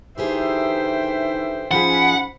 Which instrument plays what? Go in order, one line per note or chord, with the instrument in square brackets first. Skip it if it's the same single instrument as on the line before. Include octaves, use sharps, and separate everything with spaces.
[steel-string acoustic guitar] D3 G4 G#4 [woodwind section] E3 D#4 E5 [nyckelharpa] C5 G5
[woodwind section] G#2 C#4 B5 [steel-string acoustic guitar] F3 F4 G#4 [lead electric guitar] F#5